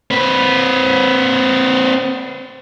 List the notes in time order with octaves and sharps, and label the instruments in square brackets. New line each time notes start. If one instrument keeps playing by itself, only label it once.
[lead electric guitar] C4 B4